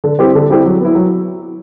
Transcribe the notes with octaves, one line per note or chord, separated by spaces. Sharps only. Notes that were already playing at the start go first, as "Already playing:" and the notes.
D3
G3 C4 E4 G4
D3
G3 C4 E4 G4
F#3
B3 E4
F#3